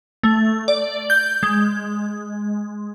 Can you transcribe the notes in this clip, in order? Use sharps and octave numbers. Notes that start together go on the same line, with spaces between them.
A3
D5
G6
G#3